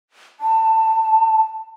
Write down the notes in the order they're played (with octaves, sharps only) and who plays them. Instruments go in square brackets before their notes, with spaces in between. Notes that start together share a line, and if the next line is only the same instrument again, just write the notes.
[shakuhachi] A5